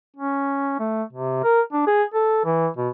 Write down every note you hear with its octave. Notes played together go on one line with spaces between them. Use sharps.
C#4
A3
C3
A#4
D4
G#4
A4
E3
B2